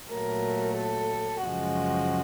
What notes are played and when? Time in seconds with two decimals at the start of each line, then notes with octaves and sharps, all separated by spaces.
0.11 A#2 F#3 A3 A#4
0.77 A4
1.44 F#2 C#3 F3 G#3 F#4